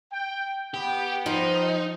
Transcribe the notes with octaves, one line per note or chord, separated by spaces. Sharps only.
G5
B3 G4 G5
F3 D#4